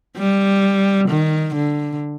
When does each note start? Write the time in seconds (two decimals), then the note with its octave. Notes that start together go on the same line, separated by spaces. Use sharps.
0.18 G3
1.09 D#3
1.55 D3